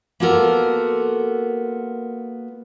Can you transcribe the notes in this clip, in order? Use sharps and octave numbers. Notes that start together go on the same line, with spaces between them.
A#3 B3 F4 F#4 A4 A#4